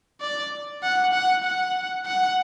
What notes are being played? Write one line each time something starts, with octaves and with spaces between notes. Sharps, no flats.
D5
F#5
F#5
F#5
F#5